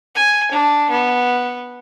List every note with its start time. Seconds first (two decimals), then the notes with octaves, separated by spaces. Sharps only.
0.15 G#5
0.51 D4
0.90 B3